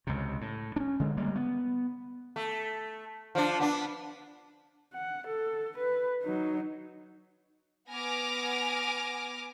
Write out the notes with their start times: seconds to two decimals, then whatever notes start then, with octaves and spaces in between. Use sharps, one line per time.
0.07 C#2 C3
0.41 A2
0.76 C#4 D4
1.00 D3 G#3
1.17 G3 G#3 A#3
1.35 B3
2.36 A3
3.35 F3 D4
3.60 B3 D4
4.94 F#5
5.27 A4
5.78 B4
6.23 F#3 D#4
7.90 B3 G#5 D6 F6 A#6